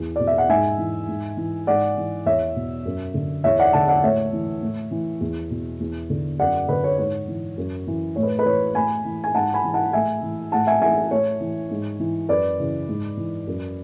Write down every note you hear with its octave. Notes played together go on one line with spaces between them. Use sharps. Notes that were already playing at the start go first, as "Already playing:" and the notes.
Already playing: E2
B2 D5
E5
F#5
G#2 E5 G#5
E3
G#2
E3
G#2 D5 F#5
E3
E2 C#5 E5
B2
F#2
D3
E2 C#5 E5
D5 F#5
D3 F#5 A5
D5 F#5
A2 C#5 E5
E3
A2
E3
E2
B2
E2
D3
F#2 D5 F#5
D3 B4
C#5
G#2 C#5
E3
F#2
E3
A2 C#5
B4
B4
E3 C#5
A2 G#5 B5
E3
G#5
G#2 F#5 A5
G#5 B5
E3
F#5 A5
A2 E5 G#5
E3
A2 F#5 A5
E5 G#5
E3 E5 G#5
A2 C#5
E3
G#2
E3
F#2 B4 D5
C#3 E3
G#2
E3
F#2